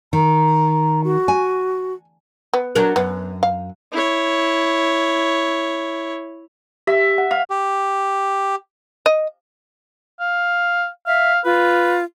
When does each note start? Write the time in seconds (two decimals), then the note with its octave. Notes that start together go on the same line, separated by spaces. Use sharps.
0.13 D#3 A#5
1.04 F#4
1.28 G#5
2.54 B3
2.75 F#3 D4 A#4
2.96 F#2 B3
3.43 F5
3.92 E4 C#5
6.87 G4 E5
7.18 F#5
7.31 F5
7.50 G4
9.06 D#5
10.20 F5
11.07 E5 F5
11.45 F4 B4